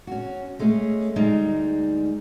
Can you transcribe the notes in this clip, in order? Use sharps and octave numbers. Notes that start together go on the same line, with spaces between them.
C#4 F#4
G#3 A3 C#4 G#4
D2 G3 G#3 D#4 A#5